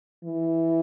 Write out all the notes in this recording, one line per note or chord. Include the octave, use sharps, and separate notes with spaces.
E3